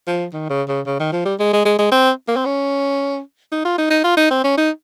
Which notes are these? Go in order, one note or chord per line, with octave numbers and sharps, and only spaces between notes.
F3
D#3
C#3
C#3
C#3
D#3
F3
G3
G#3
G#3
G#3
G#3
C4
A#3
C4
C#4
D#4
F4
D#4
D#4
F4
D#4
C4
C#4
D#4